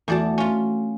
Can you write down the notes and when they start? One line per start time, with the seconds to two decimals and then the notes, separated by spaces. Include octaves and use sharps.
0.08 E2 A3 F#4 D5 A5
0.38 C#4 F4